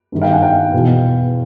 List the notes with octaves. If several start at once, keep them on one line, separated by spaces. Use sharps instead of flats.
G2 D#3
F5 G5
F#5 G#5
F5 G5
E2 B2